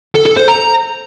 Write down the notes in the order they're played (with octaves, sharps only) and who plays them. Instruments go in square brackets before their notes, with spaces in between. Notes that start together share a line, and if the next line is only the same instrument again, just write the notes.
[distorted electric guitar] A4
A4
C5
A#5